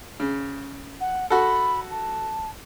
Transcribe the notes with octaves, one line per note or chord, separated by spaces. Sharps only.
C#3
F#5
F#4 A4 B5
A5